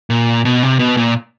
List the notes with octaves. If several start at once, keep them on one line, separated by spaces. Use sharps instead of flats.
A#2
B2
C3
B2
A#2